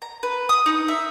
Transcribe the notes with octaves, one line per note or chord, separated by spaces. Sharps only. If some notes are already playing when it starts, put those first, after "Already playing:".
A#5
B4
D#6
D#4
E5